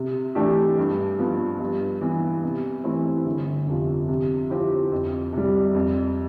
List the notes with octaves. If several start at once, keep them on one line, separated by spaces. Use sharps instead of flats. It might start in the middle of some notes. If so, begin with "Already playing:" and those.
Already playing: C3
E3 A3 D4 G4
G2
F3 B3
G2
E3 B3
C3
E3 A3 C4 E4
G1
F2 C3 F3
C3
F3 C4 E4 G4
F2
C3 G3
F2